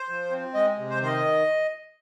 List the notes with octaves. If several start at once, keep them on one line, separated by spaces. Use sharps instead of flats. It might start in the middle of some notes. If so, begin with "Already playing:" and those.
Already playing: C5
F3
C4
G#3 D#5
C3
C5
D#3 C5
D#5